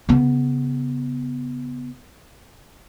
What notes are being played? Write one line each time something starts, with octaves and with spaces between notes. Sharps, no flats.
C#3 B3